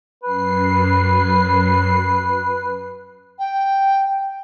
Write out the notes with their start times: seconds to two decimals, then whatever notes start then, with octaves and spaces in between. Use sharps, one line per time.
0.24 F#2 B4 C7
3.39 G5